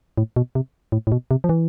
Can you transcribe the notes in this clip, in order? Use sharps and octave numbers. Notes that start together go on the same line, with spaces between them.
A2
B2
C3
A2
A2
B2
C3
F3
E3